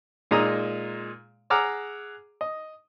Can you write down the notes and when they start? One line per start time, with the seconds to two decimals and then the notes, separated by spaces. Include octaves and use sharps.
0.31 A#2 G#3 D#4 A#5 D#6 E6
1.50 G#4 F#5 A#5 D6 E6 F6
2.41 D#5